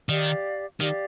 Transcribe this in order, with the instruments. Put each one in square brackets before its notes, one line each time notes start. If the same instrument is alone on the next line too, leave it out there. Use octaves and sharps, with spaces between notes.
[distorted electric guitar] D#3 [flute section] G4 D5 F5
[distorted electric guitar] D#3 [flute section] G4 D5 F5